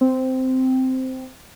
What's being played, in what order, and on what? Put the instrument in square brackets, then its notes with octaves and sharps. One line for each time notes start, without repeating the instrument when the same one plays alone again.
[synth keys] C4